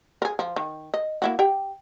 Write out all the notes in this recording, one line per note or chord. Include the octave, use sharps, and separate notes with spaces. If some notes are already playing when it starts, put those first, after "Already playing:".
G#4 A#4
F3
D#3
D#5
A#3 E4 F#4
G4 G5